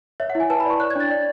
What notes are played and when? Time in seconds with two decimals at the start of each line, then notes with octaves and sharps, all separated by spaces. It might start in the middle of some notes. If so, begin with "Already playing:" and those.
0.20 C#5 E5
0.30 F#5
0.35 E4
0.40 G#5
0.50 B4 A5
0.60 B5
0.65 D5
0.70 C#6
0.80 C#5 F#6
0.90 G#6
0.96 D4 A6
1.11 D5